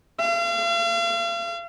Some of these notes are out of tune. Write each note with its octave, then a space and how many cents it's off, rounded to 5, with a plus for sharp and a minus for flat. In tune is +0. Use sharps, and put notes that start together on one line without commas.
F5 -40